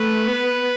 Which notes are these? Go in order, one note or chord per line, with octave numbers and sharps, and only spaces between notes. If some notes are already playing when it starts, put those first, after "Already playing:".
Already playing: A3 B4
B3